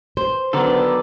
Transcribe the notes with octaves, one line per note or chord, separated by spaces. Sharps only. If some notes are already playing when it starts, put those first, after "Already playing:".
C5
D3 D#3 F#3 B3 A4 D5